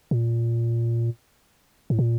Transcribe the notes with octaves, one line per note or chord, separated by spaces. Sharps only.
A#2
A2
A#2